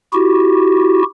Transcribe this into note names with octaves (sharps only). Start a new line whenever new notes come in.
E4 F#4 G4